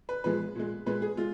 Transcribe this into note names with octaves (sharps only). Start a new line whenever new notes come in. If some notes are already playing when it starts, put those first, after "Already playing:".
B4
A#2 F3 G#3 B4
A#2 G#3
A#2 G#3 B4
G#4
G#3 F4